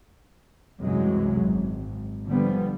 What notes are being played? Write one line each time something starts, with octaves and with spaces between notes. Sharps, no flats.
C2 F#2 E3 F#3 G#3
G#1
D3 F3 G3 B3